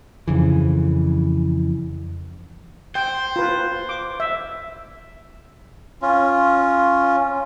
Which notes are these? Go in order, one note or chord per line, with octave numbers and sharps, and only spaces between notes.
F2 C#3 E3
C5 G5
F4 B4
D6
E5
C#4 F4